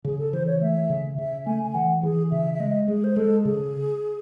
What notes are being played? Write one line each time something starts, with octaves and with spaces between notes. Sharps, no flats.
C#3 G#4
A4
E3 C5
C#5
A3 E5
C#3
C#3 E5
A3 G#5
G#5
E3 F#5
E3 G#4
C#3 E5
E5
G#3 D#5
G#3 G#4
C5
G#3 A4
C#3 G#4